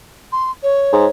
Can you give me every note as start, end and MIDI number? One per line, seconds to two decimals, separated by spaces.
0.32 0.51 84
0.63 1.09 73
0.93 1.06 44